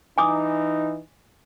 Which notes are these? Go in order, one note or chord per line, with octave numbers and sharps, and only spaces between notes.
E3 D#4 G#5 D6 D#6